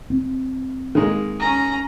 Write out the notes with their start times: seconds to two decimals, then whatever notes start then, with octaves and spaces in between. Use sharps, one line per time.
0.10 C4
0.95 D#3 G#3 A#3
1.40 C#4 A#5